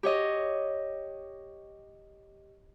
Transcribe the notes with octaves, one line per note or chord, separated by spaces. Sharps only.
G4 C#5 D#5